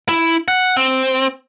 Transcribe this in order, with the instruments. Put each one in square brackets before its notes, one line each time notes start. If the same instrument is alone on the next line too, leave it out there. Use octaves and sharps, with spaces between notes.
[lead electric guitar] E4
F#5
C4